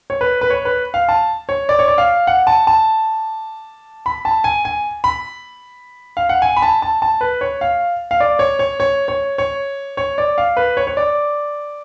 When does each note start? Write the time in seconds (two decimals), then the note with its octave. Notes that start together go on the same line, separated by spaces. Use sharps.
0.10 C#5
0.21 B4
0.41 B4
0.50 C#5
0.65 B4
0.94 F5
1.09 A5
1.49 C#5
1.69 D5
1.79 C#5
1.88 D5
1.98 F5
2.27 F#5
2.47 A5
2.67 A5
4.06 B5
4.25 A5
4.44 G#5
4.65 G#5
5.04 B5
6.17 F5
6.29 F#5
6.42 G#5
6.57 B5
6.62 A5
6.82 A5
7.02 A5
7.21 B4
7.41 C#5
7.61 F5
8.11 F5
8.20 D5
8.39 C#5
8.59 C#5
8.80 C#5
9.08 C#5
9.38 C#5
9.97 C#5
10.18 D5
10.38 F5
10.57 B4
10.77 C#5
10.87 C#5
10.97 D5